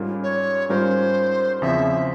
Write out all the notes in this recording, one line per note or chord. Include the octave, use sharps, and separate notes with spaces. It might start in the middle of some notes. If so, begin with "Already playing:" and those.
Already playing: G#2 G3 C#4 F4 A#4
C#5
G#2 G3 C#4 F4 A#4 C5
E2 C#3 F3 C4 E5